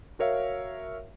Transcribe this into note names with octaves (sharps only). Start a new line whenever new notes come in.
F#4 A#4 C#5 E5 F5